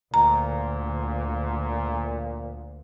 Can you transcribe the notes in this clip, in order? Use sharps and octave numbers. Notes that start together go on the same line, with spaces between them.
D2 A#2 A#5